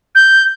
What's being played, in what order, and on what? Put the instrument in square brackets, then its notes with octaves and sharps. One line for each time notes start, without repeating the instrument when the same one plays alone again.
[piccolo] G6